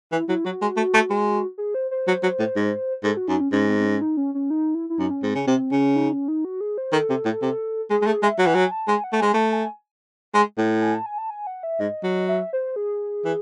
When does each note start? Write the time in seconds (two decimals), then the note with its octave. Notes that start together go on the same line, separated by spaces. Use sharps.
0.12 E3 E4
0.28 F#3 E4
0.45 F#3 F#4
0.62 G#3
0.77 A3
0.94 A3
1.10 G#3
1.58 G#4
1.74 C5
1.91 C5
2.08 F#3
2.23 F#3
2.39 A2
2.56 G#2
3.04 G#2 A4
3.17 F#4
3.28 F#2 D#4
3.41 C#4
3.52 G#2 C#4
3.69 C4
3.79 C4
3.85 C#4
4.01 D#4
4.17 C#4
4.34 C#4
4.50 D#4
4.75 E4
4.90 E4
4.99 F#2 D#4
5.10 C#4
5.23 G#2 C4
5.35 C#3 C#4
5.47 C3 C4
5.71 C#3 C#4
5.96 D#4
6.13 C#4
6.28 D#4
6.45 F#4
6.61 G#4
6.78 C5
6.93 D#3 A4
7.10 C3
7.25 A2
7.42 C3
7.90 G#3 G#4
8.02 G#3
8.06 A3 G#4
8.22 G#3 E5
8.39 F#3 F#5
8.46 E3
8.54 F#3 G#5
8.71 A5
8.88 G#3 G#5
9.04 F#5
9.13 A3
9.20 G#3 G#5
9.34 A3 A5
9.52 G#5
10.34 G#3
10.58 A2
10.82 G#5
10.95 A5
11.06 G#5
11.18 A5
11.30 G#5
11.47 F#5
11.63 E5
11.80 G#2 D#5
12.03 F#3
12.28 E5
12.53 C5
12.76 G#4
13.25 E3